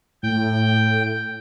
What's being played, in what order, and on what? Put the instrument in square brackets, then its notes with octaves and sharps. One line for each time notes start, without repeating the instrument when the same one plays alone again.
[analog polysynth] A2 [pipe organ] G5